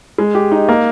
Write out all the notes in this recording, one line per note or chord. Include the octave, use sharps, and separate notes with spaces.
G#3
G4
D#4
A#3